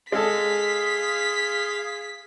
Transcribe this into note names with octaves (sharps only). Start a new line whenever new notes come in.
G#3 G#4 A4 F5 C6 B6